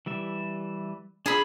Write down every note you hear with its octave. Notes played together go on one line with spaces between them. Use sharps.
E3 G3 E5
D4 F4 G#4 B5 E6